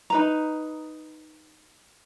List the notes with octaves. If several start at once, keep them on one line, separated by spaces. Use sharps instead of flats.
D#4 B4 A#5